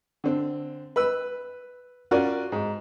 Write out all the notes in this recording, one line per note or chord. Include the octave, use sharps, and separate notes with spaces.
D3 C4
B4 B5 E6
C#4 F4 F#4 A#4 D5
G#2